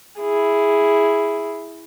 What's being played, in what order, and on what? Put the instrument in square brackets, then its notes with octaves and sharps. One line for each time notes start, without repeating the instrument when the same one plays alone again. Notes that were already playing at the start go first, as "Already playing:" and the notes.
[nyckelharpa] E4 G#4